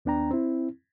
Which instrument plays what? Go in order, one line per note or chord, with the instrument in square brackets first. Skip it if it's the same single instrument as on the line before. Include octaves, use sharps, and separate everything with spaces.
[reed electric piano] D#2 B3 D4 G5 A#5
C4 E4